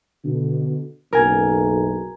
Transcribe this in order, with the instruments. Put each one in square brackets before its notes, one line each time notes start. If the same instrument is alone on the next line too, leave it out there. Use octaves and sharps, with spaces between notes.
[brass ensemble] B2 D3
[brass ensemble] F#1 B1 [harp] A#4 G#5